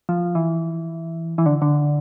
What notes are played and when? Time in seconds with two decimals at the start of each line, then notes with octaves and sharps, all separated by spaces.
0.09 F3
0.35 E3
1.38 E3
1.46 D3
1.62 D3